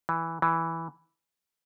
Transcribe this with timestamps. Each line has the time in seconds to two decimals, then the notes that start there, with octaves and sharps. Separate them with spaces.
0.09 E3
0.42 E3